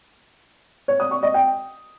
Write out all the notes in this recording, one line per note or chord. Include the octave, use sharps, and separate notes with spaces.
C#5
D#6
C#6
D#5
G5